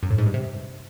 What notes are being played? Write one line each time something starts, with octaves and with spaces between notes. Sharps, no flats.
F#2
A2
G#2
G2
C3